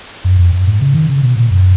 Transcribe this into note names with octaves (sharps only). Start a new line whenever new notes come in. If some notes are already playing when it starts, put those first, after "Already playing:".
F#2
F2
F#2
G#2
C#3
D#3
C#3
B2
A#2
F#2